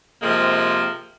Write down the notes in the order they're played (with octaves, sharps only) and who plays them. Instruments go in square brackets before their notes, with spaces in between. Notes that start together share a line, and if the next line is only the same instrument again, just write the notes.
[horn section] C3 F3 G#3 A#3